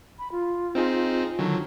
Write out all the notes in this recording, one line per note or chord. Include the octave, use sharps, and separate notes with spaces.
B5
F4
C4 D#4 G#4
D3 D#3 F#3